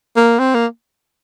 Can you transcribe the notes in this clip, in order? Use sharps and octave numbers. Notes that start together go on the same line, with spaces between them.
A#3
C4
A#3